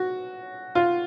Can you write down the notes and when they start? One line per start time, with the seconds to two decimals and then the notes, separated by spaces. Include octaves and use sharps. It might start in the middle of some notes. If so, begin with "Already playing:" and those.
Already playing: F#4
0.75 F4